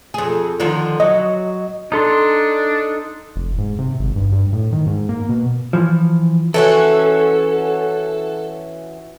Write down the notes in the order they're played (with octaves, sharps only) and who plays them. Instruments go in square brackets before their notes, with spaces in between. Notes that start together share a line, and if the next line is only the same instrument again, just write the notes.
[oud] F2 G#4
D3 D#3 F3
[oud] F#3 [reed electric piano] D#5
[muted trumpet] D4 [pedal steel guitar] D#4 A4 C6
[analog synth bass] F1
G#2
C3
G#1
G2
G2
A2
D#3
G#2
A#3
B2
[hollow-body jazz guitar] E3 F3
[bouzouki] E3 C#4 F#4 [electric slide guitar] A4